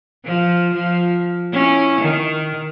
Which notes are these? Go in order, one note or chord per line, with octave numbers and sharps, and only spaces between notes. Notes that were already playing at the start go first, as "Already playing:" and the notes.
F3
F3
C#4 E4
D#3